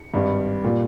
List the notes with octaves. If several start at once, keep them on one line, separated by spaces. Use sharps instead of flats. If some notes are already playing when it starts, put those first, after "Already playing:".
Already playing: C#7
G#1 G2 G3
A#2 G3